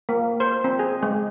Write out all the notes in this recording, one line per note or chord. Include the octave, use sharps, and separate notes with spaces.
A#3
C5
C4
G#4
G#3